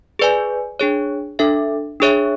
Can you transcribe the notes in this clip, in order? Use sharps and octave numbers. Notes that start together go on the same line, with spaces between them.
G#4 B4 D5 G#5
D4 G#4 C#5
D4 A4 E5
D4 G#4 C#5 E5